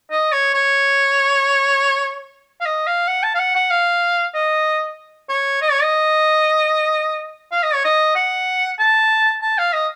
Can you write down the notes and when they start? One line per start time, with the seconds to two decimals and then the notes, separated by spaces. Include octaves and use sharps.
0.11 D#5
0.32 C#5
0.54 C#5
2.61 F5
2.66 D#5
2.87 F5
3.08 F#5
3.24 A5
3.35 F5
3.39 F#5
3.55 F#5
3.70 F5
4.35 D#5
5.29 C#5
5.62 D#5
5.72 C#5
5.82 D#5
7.52 F5
7.63 D#5
7.74 C#5
7.85 D#5
8.16 F#5
8.79 A5
9.42 A5
9.58 F5
9.73 D#5